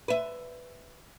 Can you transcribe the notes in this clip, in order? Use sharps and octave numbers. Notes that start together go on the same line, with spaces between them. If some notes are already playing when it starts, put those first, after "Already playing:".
B4 E5